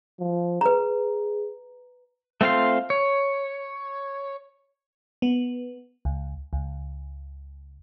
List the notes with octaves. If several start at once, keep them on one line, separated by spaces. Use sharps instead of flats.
F3
G#4 B4 A#5
A3 C4 F4 F5 C6
C#5
B3
C#2
C#2